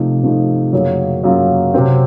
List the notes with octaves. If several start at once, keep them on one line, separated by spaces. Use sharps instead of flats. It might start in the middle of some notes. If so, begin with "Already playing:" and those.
Already playing: C3 F3 A3 D#4
C3 F3 A3 D#4
F#2 C#3 F#3 A#3 F4
F#2 C#3 F#3 A#3 F4
C3 F#3 C4